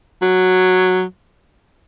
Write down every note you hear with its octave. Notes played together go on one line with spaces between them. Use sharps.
F#3